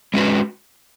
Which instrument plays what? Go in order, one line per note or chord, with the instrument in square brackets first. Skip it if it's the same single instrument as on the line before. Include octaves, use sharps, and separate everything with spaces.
[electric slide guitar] G#3 C#4 F#4 B4